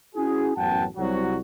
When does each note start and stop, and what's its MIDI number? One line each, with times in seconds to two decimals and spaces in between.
0.14 0.51 61
0.14 0.51 64
0.14 0.51 66
0.14 0.51 68
0.56 0.86 33
0.56 0.86 42
0.56 0.86 59
0.56 0.86 78
0.56 0.86 79
0.56 0.86 81
0.97 1.38 36
0.97 1.38 54
0.97 1.38 66